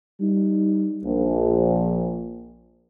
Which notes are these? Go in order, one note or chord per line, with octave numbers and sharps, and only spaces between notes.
G3 D#4
A#1